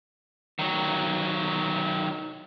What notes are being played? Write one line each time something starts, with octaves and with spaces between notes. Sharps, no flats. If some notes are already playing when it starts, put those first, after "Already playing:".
D#3 F#3